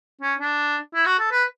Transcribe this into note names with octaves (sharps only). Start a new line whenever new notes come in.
C#4
D4
E4
F#4
A4
B4